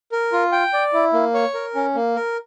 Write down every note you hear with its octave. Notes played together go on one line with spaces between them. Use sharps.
A#4
F4
G5
D5
E4
A#3
C#5
A#4
C#4
A#3
A#4